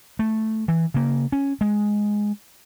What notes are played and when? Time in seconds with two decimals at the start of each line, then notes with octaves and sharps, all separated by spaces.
0.19 A3
0.68 E3
0.94 C#3 A#3
1.32 C#4
1.61 G#3